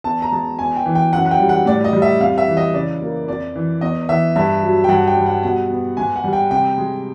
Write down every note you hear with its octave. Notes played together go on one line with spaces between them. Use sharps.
E2 A5
A#5
G#3 A5
E2 G#5
G5
E3
G5
F#2 F#5
F#5
G5
G3
F#5
A2 D5
D#5
G3
E5
F2 F5
E5
E3
D#5
C#3 D5
A#3
F2 D5
E3
E2 D#5
E3 E5
G2 E5
F#3
G5
G2 F#5
G5
G3
F#5
B2 F#5
B3
G#2 G#5
F#5
G3
G5
C3 G5
G#3